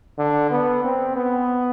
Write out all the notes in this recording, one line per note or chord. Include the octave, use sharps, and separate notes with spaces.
D3
B3
C4
B3